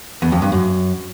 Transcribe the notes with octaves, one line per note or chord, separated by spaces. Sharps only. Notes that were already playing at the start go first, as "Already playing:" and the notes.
E2
F2
G2
F#2